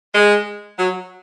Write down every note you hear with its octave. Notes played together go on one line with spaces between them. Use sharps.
G#3
F#3